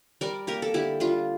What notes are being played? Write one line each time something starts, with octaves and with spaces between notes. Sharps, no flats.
G3 A#4 D5
A#3 G4 A#4
A4
D3 E4 G4
G3 D4 F4